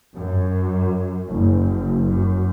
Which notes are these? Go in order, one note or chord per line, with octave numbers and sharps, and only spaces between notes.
F#2
F#1
F#2